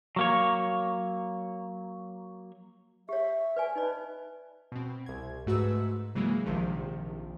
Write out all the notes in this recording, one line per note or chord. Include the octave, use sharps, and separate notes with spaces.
F#3 A#3 C#5
G4 C#5 E5
B4 D5 G#5
D#4 B4 D5 D#5
B2 C4
C2 G#6
G#2 A3 F#4 B4 E6
C#3 E3 F#3 G#3 A#3
A#1 C3 D#3 F3